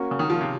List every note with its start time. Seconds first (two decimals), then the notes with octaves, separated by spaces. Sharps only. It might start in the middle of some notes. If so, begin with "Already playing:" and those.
Already playing: A#3 C#4 F#4
0.11 C#3
0.19 D#3
0.30 F3
0.41 C3